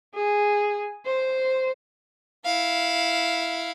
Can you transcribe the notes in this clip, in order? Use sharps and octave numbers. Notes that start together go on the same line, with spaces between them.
G#4
C5
E4 F5